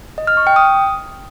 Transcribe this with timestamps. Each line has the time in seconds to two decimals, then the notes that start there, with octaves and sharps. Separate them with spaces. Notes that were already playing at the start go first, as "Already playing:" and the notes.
0.18 D#5
0.27 F6
0.37 C#6
0.47 G5
0.56 D#6